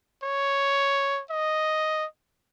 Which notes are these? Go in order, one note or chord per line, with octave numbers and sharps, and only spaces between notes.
C#5
D#5